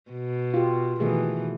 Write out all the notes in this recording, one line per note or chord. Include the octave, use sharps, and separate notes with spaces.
B2
F4 G4
B2 D#3 E3 A3 G#4